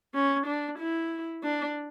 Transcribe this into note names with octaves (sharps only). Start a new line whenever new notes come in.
C#4
D4
E4
D4